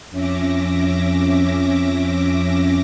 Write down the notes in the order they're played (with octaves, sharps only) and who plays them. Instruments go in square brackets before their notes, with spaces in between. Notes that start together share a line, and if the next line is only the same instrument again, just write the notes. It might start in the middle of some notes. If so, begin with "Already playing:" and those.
[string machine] F2 C#4 E5 D6 A#6